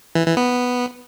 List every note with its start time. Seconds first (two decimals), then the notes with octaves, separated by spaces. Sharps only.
0.15 E3
0.26 E3
0.37 B3